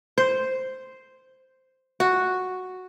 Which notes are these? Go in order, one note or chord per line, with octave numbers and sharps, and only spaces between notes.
C5
F#4